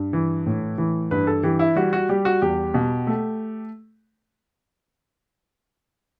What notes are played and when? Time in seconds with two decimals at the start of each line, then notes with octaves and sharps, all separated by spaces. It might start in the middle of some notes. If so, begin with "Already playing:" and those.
Already playing: G2
0.13 E3
0.46 A2
0.78 E3
1.11 G2 B4
1.27 A4
1.43 E3 G4
1.59 E4
1.76 G3 F#4
1.93 F#4
2.09 G3 G4
2.25 F#4
2.42 E2 G4
2.74 B2
3.07 A3